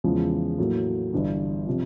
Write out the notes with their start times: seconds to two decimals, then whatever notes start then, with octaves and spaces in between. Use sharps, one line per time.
0.04 E2 C#3 F3 G#3
0.58 A2 F#3 A#3
1.13 G1 G2 E3
1.67 C3 F3